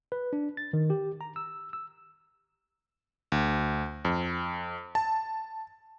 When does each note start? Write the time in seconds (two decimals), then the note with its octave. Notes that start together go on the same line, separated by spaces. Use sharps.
0.12 B4
0.33 D4
0.57 A6
0.73 D#3
0.90 G4
1.21 A#5
1.36 E6
1.73 E6
3.32 D2
4.05 F2
4.95 A5